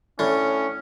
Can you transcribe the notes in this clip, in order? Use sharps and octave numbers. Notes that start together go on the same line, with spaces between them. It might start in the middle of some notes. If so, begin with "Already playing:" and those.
A2 C#4 D4